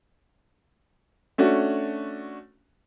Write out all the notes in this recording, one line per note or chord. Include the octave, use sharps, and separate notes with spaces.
A3 C#4 D4 F#4